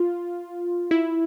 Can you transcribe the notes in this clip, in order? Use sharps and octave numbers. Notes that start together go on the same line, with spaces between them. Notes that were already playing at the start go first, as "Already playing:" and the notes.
Already playing: F4
E4